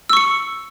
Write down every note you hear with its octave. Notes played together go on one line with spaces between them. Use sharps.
C#6 E6 C#7